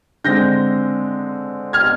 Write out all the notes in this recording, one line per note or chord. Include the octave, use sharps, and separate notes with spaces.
D3 G#3 C4 G6 A#6
F6 G#6